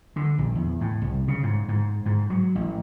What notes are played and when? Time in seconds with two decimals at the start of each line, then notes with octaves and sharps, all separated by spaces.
0.16 D3
0.38 A#1
0.55 E2
0.81 A2
1.02 C2
1.28 C#3
1.43 G#2
1.68 G#2
2.06 G#2
2.30 F#3
2.55 A1